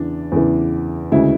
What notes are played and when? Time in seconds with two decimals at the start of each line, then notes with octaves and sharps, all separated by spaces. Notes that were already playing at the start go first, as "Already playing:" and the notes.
Already playing: E2 C#3 E3 D4
0.32 E2 C#3 E3
1.11 D2 C#3 G#3 E4